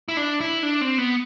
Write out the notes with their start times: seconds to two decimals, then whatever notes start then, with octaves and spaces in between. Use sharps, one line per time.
0.08 E4
0.17 D4
0.41 E4
0.63 D4
0.81 C4
0.98 B3